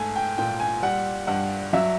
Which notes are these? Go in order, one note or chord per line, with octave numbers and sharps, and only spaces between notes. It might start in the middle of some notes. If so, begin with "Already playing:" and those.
Already playing: G#2 A3 G#5
G5
A#2 G5
G#5
G3 F#5
G2 F#5
F#3 E5